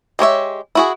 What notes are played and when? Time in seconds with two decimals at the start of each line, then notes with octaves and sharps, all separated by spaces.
0.19 G#3 G4 C#5 E5
0.75 E4 F#4 G#4